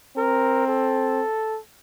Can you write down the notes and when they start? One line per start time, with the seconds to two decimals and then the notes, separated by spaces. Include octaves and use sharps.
0.16 C4 A#4
0.67 A4